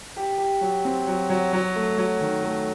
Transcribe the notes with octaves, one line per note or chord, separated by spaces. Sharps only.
G4
G4
F#3
C4
F#3
F#3
F#3
A3
F#3
D#3
A3